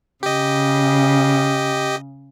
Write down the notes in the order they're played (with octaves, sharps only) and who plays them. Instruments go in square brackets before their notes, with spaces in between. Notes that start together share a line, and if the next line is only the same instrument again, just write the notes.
[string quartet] C#3 [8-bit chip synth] G4 D#5